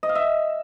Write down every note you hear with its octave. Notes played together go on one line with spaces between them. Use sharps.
D#5
F5
E5